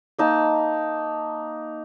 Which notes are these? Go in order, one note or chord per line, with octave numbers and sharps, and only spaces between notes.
A#3 D#4 A5